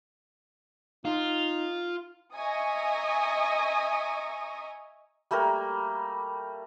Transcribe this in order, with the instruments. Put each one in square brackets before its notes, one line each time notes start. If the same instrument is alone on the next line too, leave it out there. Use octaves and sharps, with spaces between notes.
[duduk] D#4 [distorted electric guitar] F4
[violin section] D#5 E5 G#5 A#5 C#6 D#6
[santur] G3 A3 A#3 A#4